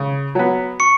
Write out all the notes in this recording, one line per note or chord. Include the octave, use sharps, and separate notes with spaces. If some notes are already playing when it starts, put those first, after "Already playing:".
Already playing: C#3
F#3 B3
C#6 C#7